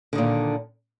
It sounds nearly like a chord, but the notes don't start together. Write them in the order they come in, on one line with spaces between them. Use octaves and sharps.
D3 D#3 A#2